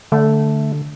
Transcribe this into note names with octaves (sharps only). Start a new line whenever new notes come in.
D3 A3